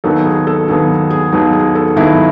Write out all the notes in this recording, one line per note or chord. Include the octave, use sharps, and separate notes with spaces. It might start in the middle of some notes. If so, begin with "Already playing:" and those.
D#2 D#3 F#3 B3 A4
G#4
A4
D#2 D#3 F#3 B3 G#4
G#4
D#2 D#3 F#3 B3
G#4
A4
D#2 D#3 F#3 B3 E4